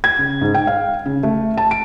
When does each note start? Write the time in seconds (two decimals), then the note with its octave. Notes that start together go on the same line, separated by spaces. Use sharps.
0.04 G#6
0.18 C#3
0.41 G#2
0.54 G5
0.67 F5
1.06 C#3
1.23 A3
1.57 A5
1.71 D7